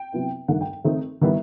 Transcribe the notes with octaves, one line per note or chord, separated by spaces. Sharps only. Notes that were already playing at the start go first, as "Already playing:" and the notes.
Already playing: G5
C3 F#3 B3 E4
G2 D#3 A3 D#4 F#5
G5
D#3 A3 C4 D#4
D#3 G3 B3 E4